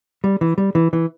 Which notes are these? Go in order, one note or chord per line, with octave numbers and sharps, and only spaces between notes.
G3
E3
G3
E3
E3